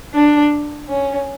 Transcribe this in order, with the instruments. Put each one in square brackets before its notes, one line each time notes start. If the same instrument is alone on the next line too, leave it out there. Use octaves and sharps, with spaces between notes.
[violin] D4
C#4